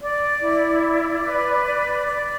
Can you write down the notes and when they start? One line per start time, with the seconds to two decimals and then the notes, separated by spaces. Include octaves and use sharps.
0.01 D5
0.41 E4
0.83 D5
1.23 B4
1.65 D5
2.05 D5